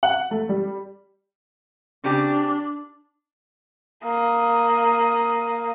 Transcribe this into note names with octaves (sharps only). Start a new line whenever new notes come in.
F#5
A3
G3
C#3 C4 D4 G4
A#3 D#6